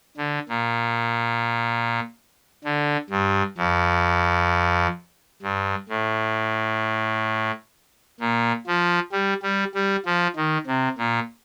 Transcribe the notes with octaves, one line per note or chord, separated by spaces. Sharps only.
D3
A#2
D3
G2
F2
G2
A2
A#2
F3
G3
G3
G3
F3
D#3
C3
A#2